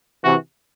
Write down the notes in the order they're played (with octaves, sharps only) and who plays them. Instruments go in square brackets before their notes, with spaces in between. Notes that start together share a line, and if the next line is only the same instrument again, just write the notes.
[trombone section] C3 E3 [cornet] F#4